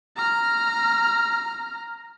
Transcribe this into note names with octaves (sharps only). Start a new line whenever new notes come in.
A#5 F6